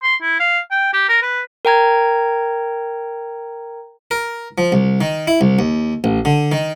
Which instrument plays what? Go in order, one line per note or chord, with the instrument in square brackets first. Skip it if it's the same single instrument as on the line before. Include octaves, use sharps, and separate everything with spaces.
[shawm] C6
E4
F5
G5
G4
A#4
B4
[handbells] A#4 G5 A#5 G#6
[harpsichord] A#4
F3
C2
D#3
E4
C2
D#2
A1
D3
D#3